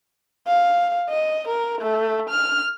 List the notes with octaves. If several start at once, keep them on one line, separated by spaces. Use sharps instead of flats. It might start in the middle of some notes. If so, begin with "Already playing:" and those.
F5
D#5
A#4
A3
F6